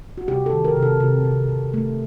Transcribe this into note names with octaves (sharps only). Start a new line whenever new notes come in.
F#4
C3 G4
A4
D#3
A#4
C3
A4
C3 G4
C3
C3
A3